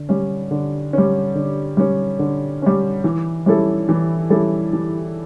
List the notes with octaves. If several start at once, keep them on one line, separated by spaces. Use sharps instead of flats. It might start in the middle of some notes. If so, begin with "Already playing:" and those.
Already playing: D3
G3 C#4
D3
G3 C#4
D3
G3 C#4
D3
G3 C#4
E3
G3 C#4 E4 A4
E3
G3 C#4 E4 A4
E3